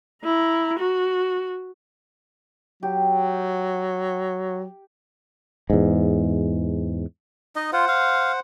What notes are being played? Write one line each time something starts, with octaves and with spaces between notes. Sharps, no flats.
E4 A#5
F#4
F#3 G4
E2 G#2
D#4 D#5
F4 C5 F#5
F5